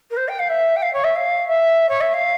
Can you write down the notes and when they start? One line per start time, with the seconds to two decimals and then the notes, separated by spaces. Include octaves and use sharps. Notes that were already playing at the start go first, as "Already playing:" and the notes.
0.10 A#4
0.16 C5
0.28 G5
0.39 F5
0.49 E5
0.76 G5
0.82 F5
0.93 C#5
1.04 E5
1.15 F5
1.47 E5
1.88 C#5
2.00 E5
2.13 F5